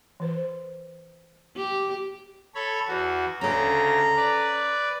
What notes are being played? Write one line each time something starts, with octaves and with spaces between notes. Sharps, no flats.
E3 B4 C5
G4
A4 C#5 B5
E2 F#4
D2 C#3 C#4 A4 A#5
B4 D5